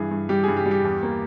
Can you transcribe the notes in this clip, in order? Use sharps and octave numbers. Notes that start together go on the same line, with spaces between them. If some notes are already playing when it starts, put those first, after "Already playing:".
Already playing: G2 E3 G#4
G2
G3 G4
G#4
G2
G4
G3
G4
E2
A#3